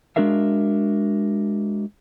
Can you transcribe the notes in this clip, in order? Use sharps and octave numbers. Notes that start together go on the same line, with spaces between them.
G#3 D4 F#4 A#4 E5 F5